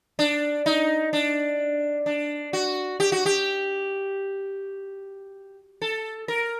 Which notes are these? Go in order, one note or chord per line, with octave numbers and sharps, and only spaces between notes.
D4
D#4
D4
D4
F#4
G4
F#4
G4
A4
A#4